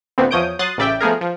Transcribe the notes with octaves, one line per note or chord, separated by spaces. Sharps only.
D2 A#2 D3 B3 C4
E2 F3 C#5 D#6 G6 D7
F#3 C6 D#6 F#6 A6
A1 C#3 D5 E5 G5
F3 A3 B3 G#4 A#4
F3